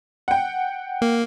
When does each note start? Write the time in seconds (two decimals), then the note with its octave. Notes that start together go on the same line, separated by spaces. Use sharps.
0.28 F#5 G5
1.02 A#3